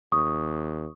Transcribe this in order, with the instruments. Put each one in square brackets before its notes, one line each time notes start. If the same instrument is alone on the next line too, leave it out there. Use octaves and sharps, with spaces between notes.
[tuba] D#2 [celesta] C#6 D#6